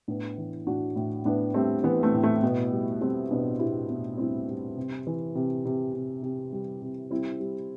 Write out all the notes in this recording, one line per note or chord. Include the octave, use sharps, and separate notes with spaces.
A2 B3 D4
E3
A2 D4 F#4
A2
A2 B3 D4
G3 A3 C4
E3 B3
A3 C4
A2
A3
B2 B3
G3
G3 A3 C4
B2 B3 D4
B2 E4 G4
B2
G3 C4 E4
G3
C3
E3
C3
C3
C3
C3
G3
C3
G3 C4 E4
G3